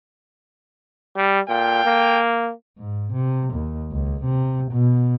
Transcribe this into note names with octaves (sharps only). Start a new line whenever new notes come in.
G3
A#2 A4 F5 G5
A#3
G#2
C3
D#2
C#2
C3
B2